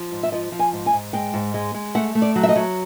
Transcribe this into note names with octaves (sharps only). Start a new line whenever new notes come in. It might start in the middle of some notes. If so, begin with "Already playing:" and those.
Already playing: F3
G#2
E5
F3 D#5
F3
G#5
G#2
G#5
G#2
G#3 G5
G#2
G#3
G#3
A3 F#5
A3
D5
F#3
E5
D#5
F#3